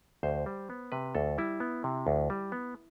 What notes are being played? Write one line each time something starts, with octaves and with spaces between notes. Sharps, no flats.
D2 C5
G3
B3
C3 B4
D2 A4
G3 E4
B3
C3
D2
G3
B3